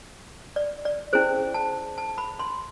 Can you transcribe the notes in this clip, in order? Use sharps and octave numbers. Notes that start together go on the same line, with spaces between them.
D5
D5
C#4 E4 G#4 C5
A5
A5
B5
C6